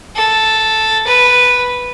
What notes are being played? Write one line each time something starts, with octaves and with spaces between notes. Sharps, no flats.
A4
B4